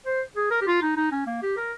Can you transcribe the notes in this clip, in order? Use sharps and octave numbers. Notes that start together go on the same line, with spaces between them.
C5
G#4
A#4
G4
F4
D#4
D#4
C#4
A#3
G4
A#4